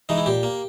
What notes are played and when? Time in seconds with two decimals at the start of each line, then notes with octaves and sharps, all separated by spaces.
0.09 E3 G#3 D#4
0.17 E4
0.26 A#2 G4
0.43 A#3